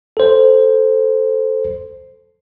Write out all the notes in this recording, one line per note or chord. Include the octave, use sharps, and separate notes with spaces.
A4 C5